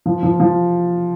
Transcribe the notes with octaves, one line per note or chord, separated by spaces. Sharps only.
F3
F3
F3